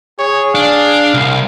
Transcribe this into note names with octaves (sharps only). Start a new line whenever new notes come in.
G#4 C#5
D4 F5
C2